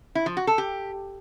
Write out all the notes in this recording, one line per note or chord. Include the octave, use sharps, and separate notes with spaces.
E4
F3
F#4
A4
G4